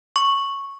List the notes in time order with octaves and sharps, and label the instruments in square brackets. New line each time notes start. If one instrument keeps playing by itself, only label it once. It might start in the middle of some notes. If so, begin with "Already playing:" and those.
[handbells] C#6